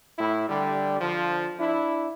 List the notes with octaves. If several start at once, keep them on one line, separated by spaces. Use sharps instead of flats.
A2 E4
D3 G3
D3 F3
D4 E4